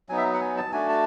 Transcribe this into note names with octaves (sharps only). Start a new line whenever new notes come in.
F#3 B3 D#4 G#5
E5
F#5
G#5
A5
A3 D4 F#4 G#5
A5